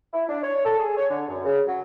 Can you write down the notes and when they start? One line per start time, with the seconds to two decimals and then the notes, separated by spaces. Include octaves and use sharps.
0.13 E4
0.29 D4
0.43 C#5
0.65 A4
0.79 G#4
0.97 C#5
1.10 D3
1.28 F#2
1.45 C#3
1.67 F#3